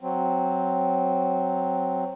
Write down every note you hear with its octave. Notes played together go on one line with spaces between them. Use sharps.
F#3 C4